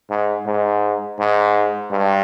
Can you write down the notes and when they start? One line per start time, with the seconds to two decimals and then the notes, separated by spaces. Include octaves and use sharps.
0.10 G#2
0.46 G#2
1.19 G#2
1.91 G2